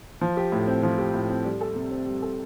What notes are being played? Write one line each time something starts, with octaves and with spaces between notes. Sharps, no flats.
F3
G4
A2
C4
F3
G4
A2
C4
G3
A4
C3
C4
G3
A4